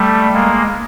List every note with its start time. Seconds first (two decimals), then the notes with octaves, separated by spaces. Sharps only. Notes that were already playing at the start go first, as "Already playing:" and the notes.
Already playing: G3 A3
0.34 G#3 A#3